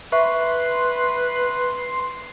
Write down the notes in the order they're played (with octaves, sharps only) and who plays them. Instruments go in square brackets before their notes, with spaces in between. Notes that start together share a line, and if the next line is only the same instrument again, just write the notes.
[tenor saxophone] B4 [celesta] E5 C#6 [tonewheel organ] C6